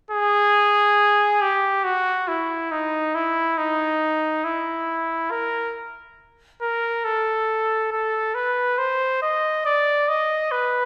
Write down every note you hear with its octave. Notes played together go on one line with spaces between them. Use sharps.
G#4
G4
F#4
E4
D#4
E4
D#4
E4
A#4
A#4
A4
A4
B4
C5
D#5
D5
D#5
B4